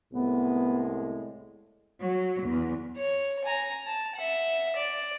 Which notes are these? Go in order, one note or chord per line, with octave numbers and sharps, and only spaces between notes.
C2 A2 G#3 B3
F#3
E2
C#5
G#5 A#5
A5
E5 F#5
D5